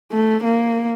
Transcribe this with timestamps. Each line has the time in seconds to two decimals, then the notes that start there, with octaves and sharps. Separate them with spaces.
0.12 A3
0.44 A#3